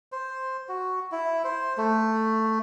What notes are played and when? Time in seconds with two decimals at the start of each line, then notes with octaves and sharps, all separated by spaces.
0.12 C5
0.69 F#4
1.12 E4
1.44 C5
1.77 A3